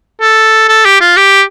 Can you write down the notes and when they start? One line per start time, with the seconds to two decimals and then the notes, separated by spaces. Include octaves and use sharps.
0.22 A4
0.69 A4
0.86 G4
1.01 F4
1.17 G4